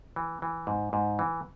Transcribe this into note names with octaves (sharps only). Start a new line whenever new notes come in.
E3
E3
G#2
G#2
E3